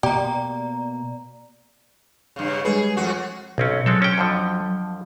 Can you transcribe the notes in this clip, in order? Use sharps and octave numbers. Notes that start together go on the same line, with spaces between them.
B2 A#3 G4 D5 A#5
G2 C#3
G3 G#3 G#4 B4
F2 F#4
B1 B2 C4 C#4
F#3 G#3 C4 A4
C#4 G5
F2 D3 F3